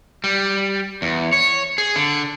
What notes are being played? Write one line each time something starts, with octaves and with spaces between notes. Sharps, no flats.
G3
E2
C#5
G#4
D3